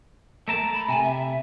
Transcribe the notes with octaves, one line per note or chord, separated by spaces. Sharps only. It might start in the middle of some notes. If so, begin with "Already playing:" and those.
A3 A#4 A5 A#5
B5
C3 G#5
E5